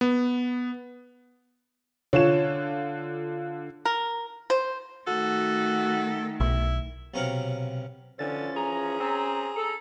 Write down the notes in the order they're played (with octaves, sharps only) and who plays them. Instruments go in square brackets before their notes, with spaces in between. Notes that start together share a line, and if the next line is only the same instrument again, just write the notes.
[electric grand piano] B3
[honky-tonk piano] D3 F4 E7 [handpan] C#5
[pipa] A#4
C5
[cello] D#3 A3 [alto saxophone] F#4 [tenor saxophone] A4
[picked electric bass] B1 [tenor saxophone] E4
[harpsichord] B1 C3 C#4 A#4 F5 F#5
[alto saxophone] D3 [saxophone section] E3 F3 C#4 [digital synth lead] A6
[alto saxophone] G#4 [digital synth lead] A#5
[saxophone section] C4 C#4
A4